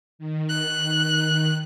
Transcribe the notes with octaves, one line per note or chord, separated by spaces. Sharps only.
D#3
F#6